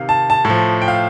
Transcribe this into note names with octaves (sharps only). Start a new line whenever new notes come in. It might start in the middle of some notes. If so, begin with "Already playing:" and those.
Already playing: C3 D#3 F5
A5
A5
A2
F3
G5
F5